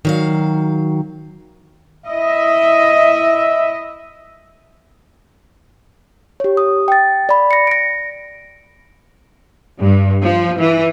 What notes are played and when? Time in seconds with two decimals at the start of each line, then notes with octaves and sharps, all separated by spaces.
0.05 D#3 F#3 F5
2.07 E4 D#5 E5
6.40 G4 C#5
6.57 D#6
6.88 G5 A6
7.29 D5 B5
7.51 A#6 C#7
7.67 A#6 D7
9.82 G2
10.23 F3
10.60 E3